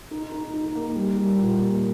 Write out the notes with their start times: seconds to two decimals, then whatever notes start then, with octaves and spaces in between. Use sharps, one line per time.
0.11 D#4
0.32 D#4
0.54 D#4
0.75 A#3
0.95 G3
1.17 G3
1.38 A#2
1.59 A#3